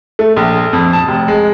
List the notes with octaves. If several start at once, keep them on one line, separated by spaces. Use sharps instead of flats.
A3
A#1
F2
A5
F1
G#3